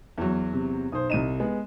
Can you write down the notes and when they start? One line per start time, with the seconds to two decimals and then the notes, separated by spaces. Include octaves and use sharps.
0.18 E2 F#3
0.53 C3
0.92 B1 C5 D#6
1.10 C2 D#4 D#7 E7
1.40 G#3 B3